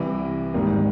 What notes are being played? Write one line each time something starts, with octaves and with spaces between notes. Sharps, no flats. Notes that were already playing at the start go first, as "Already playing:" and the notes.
Already playing: C2 C3 E3
G#1 G#2 D#3 G3 A#3